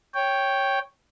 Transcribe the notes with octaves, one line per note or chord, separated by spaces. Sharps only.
C#5 G5